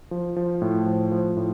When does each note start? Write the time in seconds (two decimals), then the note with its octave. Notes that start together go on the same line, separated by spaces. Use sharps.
0.11 F3
0.36 F3
0.62 A2
0.86 F3
1.12 F3
1.36 A2